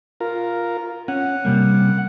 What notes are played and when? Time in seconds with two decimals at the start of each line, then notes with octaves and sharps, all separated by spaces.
0.20 F4 A#4
1.08 C#4 F#5
1.45 C3 G3 A#3